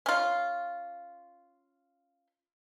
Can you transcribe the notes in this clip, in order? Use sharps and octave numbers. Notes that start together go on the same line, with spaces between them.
C#4 F4